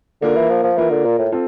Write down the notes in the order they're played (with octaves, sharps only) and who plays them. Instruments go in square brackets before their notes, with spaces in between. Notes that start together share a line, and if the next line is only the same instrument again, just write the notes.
[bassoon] D3 [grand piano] A#3 F4 A#4
[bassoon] E3
F3
F3
[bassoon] E3 [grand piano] A#3 F4 A#4
[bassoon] D3
A#2
A2
[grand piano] C4 F4 A4